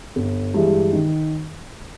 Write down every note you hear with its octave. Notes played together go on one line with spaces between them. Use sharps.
G1
G2 E3 G#3
D#3